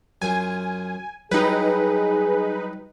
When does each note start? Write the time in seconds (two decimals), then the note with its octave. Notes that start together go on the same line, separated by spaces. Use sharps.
0.22 F#2 F4 G#5
1.31 F#3 G3 D#4 E4 G#4 B4